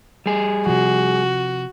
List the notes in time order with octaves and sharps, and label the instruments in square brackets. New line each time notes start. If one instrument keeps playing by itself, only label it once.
[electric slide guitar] G3 G#4
[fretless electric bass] C3 F3 [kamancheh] F#4